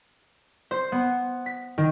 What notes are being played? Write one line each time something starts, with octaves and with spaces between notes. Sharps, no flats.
C5
B3
B6
D#3